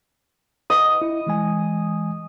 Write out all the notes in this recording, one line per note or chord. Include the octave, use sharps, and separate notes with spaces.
D#5 F#5
E4
E3 G#3 G#5